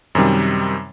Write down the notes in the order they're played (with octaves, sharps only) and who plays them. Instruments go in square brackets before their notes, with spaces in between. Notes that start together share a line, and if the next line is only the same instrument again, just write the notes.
[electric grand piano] F#2 C3 D#3 G3